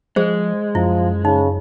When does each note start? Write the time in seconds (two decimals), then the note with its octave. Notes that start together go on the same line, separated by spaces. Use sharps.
0.16 F3 G#3 G#4 C5
0.75 F#2 F3 E4
1.25 C#3 D#4